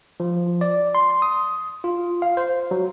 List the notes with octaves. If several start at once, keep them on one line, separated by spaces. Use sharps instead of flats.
F3
D5
C6
D#6
F4
F5
C5
F#3